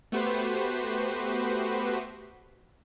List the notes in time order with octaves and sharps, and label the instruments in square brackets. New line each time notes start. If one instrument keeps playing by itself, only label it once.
[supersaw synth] A3 B3 F#4 G4 B4 C5